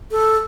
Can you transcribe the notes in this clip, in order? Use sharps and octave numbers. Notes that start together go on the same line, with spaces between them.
A4